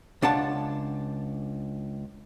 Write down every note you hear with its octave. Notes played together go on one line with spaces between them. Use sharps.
C#2 D4 F#5 A5